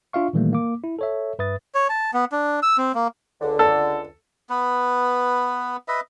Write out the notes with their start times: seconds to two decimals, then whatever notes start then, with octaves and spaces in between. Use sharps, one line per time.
0.13 D4 F4 E5 F5 C#6
0.33 A#2 D#3 E3 G3 A3 A#3
0.53 A#3 D6
0.84 E4
0.99 A4 C#5 E5
1.39 G2 B4 E5 D#6 A6
1.75 C#5
1.89 A5
2.14 B3
2.32 D4
2.63 E6
2.78 C4
2.95 A#3
3.41 C#2 D3
3.59 A4
4.50 B3 B4
5.88 B4 D#5 E5